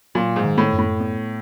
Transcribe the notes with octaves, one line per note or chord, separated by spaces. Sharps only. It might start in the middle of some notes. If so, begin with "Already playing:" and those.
A#2 F#3
G#2
D#3
A2
F#2
A2
B3